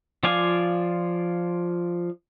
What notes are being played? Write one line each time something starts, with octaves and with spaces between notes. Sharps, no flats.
F3 F4 D5 F5 G#5